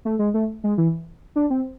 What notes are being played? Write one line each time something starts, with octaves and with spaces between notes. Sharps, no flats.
A3
G#3
A3
G#3
E3
D4
C4